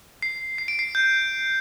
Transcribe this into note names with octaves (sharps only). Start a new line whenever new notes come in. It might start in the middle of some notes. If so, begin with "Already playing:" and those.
C7
C7
D7
C7
G6